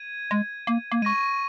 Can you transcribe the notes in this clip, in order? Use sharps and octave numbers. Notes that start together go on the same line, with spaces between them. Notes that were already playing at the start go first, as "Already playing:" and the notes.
Already playing: G#6 D#7
G#3
A#3
A#3
G#3 C#6 A#6 D#7